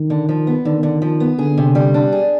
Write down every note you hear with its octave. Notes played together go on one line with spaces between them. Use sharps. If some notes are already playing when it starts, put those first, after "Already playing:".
Already playing: D#3
D3
F3
B3
D3 D#3
D3
F3
B3
D3 G#4
C3
G3
D4
G#4